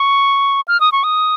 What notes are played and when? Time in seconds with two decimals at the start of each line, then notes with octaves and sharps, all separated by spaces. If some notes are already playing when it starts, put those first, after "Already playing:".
Already playing: C#6
0.68 F6
0.80 D#6
0.92 C#6
1.04 D#6